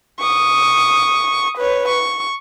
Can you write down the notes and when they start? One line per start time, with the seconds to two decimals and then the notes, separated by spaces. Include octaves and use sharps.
0.20 C#6 D#6
1.58 B4 C#5
1.88 C#6